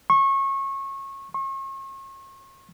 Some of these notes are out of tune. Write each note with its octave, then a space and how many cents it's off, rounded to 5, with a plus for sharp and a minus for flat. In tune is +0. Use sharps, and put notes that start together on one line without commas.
C#6 -25
C#6 -40